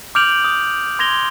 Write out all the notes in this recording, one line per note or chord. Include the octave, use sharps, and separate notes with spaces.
D6 F6 G6 D7 F7 F#7
D#6
C6 G#6 A#6 F7 G7